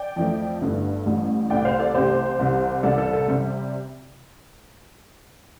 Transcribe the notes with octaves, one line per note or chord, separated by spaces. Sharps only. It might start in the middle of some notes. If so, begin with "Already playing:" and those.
Already playing: D5 G5
F2 F3 A3
G1 G2 D3 A3
A1 A2 G3
C2 C3 A3 D5 G5
C5 F5
A4 D5
C2 C3 A3 G4 C5
C2 C3 G3
C2 C3 G3 A4 D5
A4
A4
C3 G3